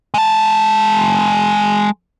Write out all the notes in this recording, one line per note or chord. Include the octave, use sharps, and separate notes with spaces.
G#3 A5